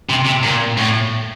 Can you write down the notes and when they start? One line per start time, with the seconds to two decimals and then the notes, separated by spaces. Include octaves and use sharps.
0.09 C3
0.25 C3
0.43 A#2
0.77 A2